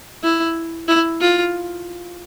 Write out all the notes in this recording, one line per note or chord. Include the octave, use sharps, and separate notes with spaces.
E4
E4
F4